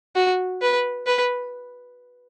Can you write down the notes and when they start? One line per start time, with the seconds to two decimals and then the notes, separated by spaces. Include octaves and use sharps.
0.16 F#4
0.61 B4
1.07 B4